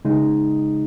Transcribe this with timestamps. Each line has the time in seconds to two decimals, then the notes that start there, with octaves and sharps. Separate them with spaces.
0.05 C#3 G#3 D#4